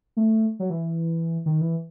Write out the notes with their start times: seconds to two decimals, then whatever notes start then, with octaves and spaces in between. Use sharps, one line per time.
0.17 A3
0.59 F#3
0.70 E3
1.46 D#3
1.61 E3